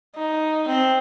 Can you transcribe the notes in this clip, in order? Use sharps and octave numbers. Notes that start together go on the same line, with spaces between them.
D#4
C4